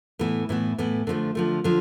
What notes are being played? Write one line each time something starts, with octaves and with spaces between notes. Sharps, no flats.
A2 E3 B3
A2 E3 B3
A2 E3 B3
D3 F3 A3
D3 F3 A3
D3 F3